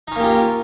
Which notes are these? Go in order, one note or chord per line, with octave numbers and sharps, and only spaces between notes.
A#3 C#4 D#4 F4 G4